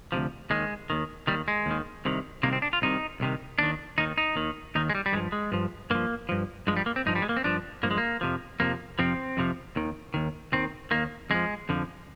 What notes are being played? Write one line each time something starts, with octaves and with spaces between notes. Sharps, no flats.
D2 C3 F3
D#2 D#3 G#3
D#2 D#3
D#2 D#3 G3
G#3
D#2 D#3
C2 C3 D#3
C2 C3 D#3 A#3
C4
D4
F4
C2 C3 D#3 D#4
C2 C3 D#3
D#2 D#3 D4
D#2 D#3 D#4
D#4
D#2 D#3
D#2 D#3 D#4
G#3
G3
G3
G2 F3 G#3
G#3
G2 F3
G2 F3 A#3
G2 F3
G2 F3 G#3
G3
A#3
C4
G2 F3 D#4
G3
G#3
A#3
C4
G2 F3 D4
G2 F3 A#3
G#3
A#3
F2 C3 F3
F2 C3 F3 A#3
F2 C3 F3 C4
F2 C3 F3
D#2 D#3
D#2 D#3
D#2 D#3 C4
D#2 D#3 A#3
F2 D3 F3 G#3
F2 D3 F3